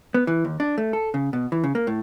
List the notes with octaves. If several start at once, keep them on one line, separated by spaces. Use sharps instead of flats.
B3
E3
D#2
D4
A3
A4
C#3
B2
E3
C#3
A#3
A2